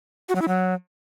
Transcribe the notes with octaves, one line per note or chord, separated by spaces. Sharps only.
F#4
F#3
E4
F#3